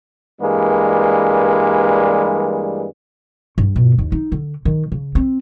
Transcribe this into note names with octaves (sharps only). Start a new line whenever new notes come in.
G2 E3 G3 G#3 A#3
G2
B2
D#2
D#4
D3
D#3
C#3
C4